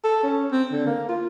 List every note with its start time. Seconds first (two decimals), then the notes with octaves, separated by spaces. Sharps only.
0.04 A4
0.23 C#4
0.52 C4
0.72 D3
0.86 A#3
1.09 F4